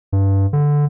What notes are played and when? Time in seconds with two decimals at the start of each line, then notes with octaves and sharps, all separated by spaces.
0.13 G2
0.53 D3